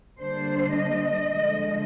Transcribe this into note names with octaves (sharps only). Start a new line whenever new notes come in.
D3 G3 A#3 D4 C5
D#5
D3 F3 G#3